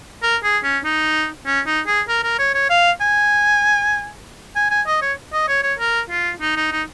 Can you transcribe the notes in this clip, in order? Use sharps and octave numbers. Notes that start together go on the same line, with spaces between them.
A#4
G#4
C#4
D#4
C#4
D#4
G#4
A#4
A#4
C#5
C#5
F5
G#5
G#5
G#5
D#5
C#5
D#5
C#5
C#5
A#4
F4
D#4
D#4
D#4